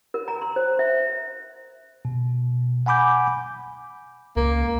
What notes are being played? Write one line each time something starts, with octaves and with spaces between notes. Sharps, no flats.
A#4
A#5
C6
C5
E5
B2
F#5 G#5 B5 D6 G6
C#2 A#3